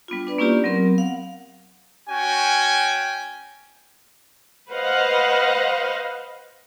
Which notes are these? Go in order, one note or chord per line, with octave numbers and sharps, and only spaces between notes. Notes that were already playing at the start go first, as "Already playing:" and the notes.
G3 B3 D4 F4
D4 B4 D5
A#3 C#4 E4 F4 G4 D5
F#3 B3 C4 A#4
F5 F#5
C#4 F#4 G5 G#5
B4 C5 D#5 F5 F#5